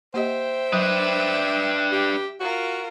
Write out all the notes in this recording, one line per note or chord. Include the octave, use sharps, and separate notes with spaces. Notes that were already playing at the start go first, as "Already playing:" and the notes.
A#3 G4 C5 D#5 E5 G5
F#3 D4 B4
G4
F4 F#4 A#4